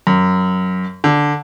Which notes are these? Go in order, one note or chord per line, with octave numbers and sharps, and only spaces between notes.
F#2
D3